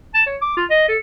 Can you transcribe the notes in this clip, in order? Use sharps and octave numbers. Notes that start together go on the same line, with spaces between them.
A5
C#5
D6
F4
D#5
A4